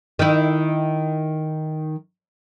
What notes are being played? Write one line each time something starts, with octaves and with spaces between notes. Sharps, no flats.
D#3 E4